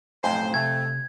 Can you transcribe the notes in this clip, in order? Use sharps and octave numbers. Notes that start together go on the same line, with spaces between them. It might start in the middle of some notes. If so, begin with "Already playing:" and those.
B1 F2 A2 C5 G#5
C3 A3 G#6